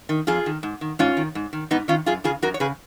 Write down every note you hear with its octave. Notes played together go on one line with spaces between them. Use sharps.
D#3
F2 F4 G#4
D#3
G#2
D#3
G#2 C#4 F4
D#3
G#2
D#3
G#2 B3 D#4
D#3 C#4 F4
F#2 F4 G#4
C#3 F4 G#4
F#2 F#4 A#4
C#5
C#3 G#4 B4